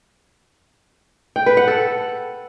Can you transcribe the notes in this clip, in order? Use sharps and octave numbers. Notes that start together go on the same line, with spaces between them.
G5
B4
F#5
A4